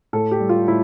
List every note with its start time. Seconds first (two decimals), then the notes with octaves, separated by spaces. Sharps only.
0.13 A2 A4
0.31 G4
0.40 G3
0.49 F4
0.68 A2 E4